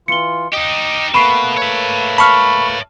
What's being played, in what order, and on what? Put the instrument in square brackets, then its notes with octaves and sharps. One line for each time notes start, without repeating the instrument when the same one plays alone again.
[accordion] E3 F4 [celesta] C#7 G7
[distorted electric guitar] D#4 G4 [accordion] D#5
[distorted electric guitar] B2 [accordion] A3 A#3 B4 [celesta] B5 C#6 C7
[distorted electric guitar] C#5 E5
[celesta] A5 F6 [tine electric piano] B5 C#6